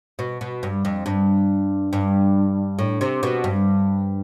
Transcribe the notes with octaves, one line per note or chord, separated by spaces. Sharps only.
B2
B2
G2
F2
G2
G2
A2
C3
B2
G2